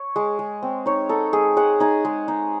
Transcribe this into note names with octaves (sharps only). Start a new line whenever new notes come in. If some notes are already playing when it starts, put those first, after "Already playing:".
Already playing: C#5
G#3
G#3
C4
D#4 C#5
D#4 A4
G#3 G#4
G#3 F#5
D#4 G#5
G#3
D#4